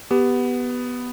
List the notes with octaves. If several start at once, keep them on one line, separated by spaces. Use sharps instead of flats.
B3 G4